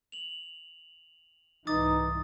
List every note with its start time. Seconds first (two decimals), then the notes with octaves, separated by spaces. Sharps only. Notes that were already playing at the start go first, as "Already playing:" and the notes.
0.12 F7 F#7
1.67 C2 G#2 E3 D#4 D6 D#6 A6